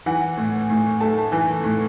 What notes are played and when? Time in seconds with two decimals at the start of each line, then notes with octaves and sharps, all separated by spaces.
0.06 E3 F#5
0.37 A2
0.70 A2
1.01 A3 A5
1.32 E3
1.64 A2